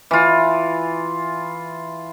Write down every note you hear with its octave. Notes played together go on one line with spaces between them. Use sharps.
E3 F4